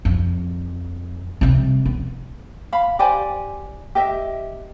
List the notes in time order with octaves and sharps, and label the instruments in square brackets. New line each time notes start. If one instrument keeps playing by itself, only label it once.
[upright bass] F2
C3 G3
B3
[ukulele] F5 B5
G4 C5 D5 G#5
G4 D#5 E5